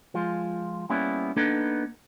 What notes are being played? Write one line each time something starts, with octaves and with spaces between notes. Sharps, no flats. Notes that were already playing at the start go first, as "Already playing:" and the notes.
F3 G#3 F4
G3 A#3 B3 C#4 E4
A#3 B3 D4 D#4 A4 B4